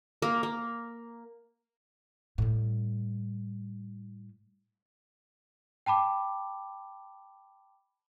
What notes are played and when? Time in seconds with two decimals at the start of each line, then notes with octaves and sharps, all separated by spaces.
0.22 A#3
0.43 A#3
2.38 A2 G3
5.86 G5 A5 B5 D6